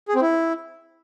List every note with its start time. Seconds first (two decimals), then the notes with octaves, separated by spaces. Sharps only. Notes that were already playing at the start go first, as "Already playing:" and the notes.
0.08 G#4
0.15 C4
0.22 E4